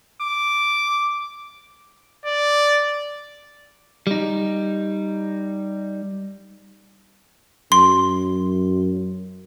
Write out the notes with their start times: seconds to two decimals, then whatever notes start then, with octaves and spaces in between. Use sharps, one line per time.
0.20 D6
2.26 D5
4.07 G3 D#4
7.72 F#2 C6